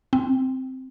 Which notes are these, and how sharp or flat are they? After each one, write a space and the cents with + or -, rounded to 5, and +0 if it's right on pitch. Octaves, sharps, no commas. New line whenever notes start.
C4 -5